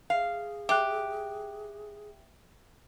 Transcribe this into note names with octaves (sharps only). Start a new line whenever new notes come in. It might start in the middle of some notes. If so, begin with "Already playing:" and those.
G#4 F5
G4 E5 G5 F#6